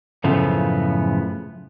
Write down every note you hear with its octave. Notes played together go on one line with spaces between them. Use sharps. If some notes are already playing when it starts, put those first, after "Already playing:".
F#2 A2 C#3 F3 A3 B3